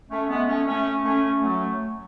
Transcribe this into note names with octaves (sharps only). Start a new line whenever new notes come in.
A3 C#4
G#3 B3
A3 C#4
A3 C#4
A3 C#4
F#3 A3